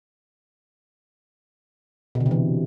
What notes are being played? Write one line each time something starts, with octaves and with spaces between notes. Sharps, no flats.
B2
D3
C3
E3